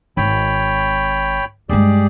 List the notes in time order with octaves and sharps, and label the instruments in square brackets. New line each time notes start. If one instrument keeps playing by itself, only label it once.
[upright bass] G#1 [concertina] C#5 G5 B5
[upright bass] G2 G#3 [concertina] G4 G#4 D5